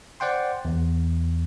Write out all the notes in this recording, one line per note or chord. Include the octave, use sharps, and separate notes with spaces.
C5 D5 F#5 G5 C6
E2